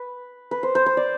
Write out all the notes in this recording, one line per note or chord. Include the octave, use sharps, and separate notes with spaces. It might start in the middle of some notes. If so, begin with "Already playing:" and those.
Already playing: B4
B4
C5
C5
C5
D5